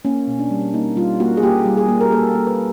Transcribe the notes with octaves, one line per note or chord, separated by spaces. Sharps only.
A#3 C#4
B2
D4
G3
A#3 D#4
G3 F4
A#3 F#4
G#4
A#3 G4
G3
G#4
A#3
A#4
A#3 A4
A#3
B4